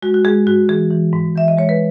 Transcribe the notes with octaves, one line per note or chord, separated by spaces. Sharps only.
G#3 F#4
F#4
G#3 G#4
G#2 F#4
E3 G#4
E3
G#2
E3 E5
D#5
G#3 C#5
B4